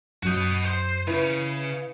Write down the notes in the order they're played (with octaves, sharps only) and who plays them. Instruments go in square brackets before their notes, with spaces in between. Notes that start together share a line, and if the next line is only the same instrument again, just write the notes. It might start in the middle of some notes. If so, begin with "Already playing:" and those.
[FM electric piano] F#2 F#3 G6 [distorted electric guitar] F#4 D#5
[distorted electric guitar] C5 C6
[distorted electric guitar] C#3 [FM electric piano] E4 B4